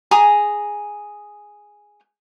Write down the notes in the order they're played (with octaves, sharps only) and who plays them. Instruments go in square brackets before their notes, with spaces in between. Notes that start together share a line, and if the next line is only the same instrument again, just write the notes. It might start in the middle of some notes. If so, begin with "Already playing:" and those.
[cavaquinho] G#4 G#5 A#5 D#6